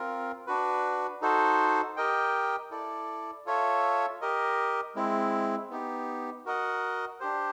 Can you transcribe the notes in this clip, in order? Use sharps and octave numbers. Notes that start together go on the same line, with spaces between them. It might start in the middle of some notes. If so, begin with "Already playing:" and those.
Already playing: C4 F4 A#4
D4 F#4 B4
D#4 F#4 A4 C5
G4 A#4 D#5 G5
E4 A4 D5
F4 A4 C#5 E5
G4 A#4 D#5
G#3 C4 E4
B3 D#4 G4
F#4 A#4 D#5 F#5
D4 G4 C5